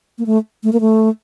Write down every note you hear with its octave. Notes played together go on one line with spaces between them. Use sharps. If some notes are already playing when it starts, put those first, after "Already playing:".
A#3
A3
A3
A#3
A3